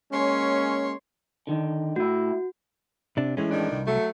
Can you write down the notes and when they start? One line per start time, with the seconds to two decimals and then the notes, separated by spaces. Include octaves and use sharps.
0.12 G#3 A#3 C#4 C#5 C6
1.47 D3 D#3
1.96 A2 E4 F#4
3.17 C3 D4
3.37 A2 E3 G#3 C#4
3.50 A2 D#3 D4
3.71 C2
3.85 F#3 A3